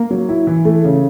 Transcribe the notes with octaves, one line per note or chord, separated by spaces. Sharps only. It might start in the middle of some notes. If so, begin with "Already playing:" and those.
Already playing: A#3
F#3
E4
E3
A3
C#3